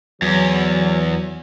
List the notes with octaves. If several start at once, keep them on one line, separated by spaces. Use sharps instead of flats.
E2 F#3